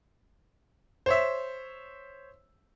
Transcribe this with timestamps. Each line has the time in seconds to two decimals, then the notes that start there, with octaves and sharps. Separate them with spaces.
1.06 C5 C#5 E5